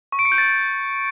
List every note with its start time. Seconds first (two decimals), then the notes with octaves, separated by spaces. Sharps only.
0.12 C#6
0.19 D7
0.25 C#7
0.32 G6
0.38 A6